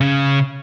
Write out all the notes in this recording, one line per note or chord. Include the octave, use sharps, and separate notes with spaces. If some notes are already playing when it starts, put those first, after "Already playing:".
C#3